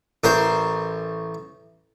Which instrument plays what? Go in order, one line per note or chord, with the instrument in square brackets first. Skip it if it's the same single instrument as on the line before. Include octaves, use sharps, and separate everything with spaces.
[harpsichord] A1 A#4 C5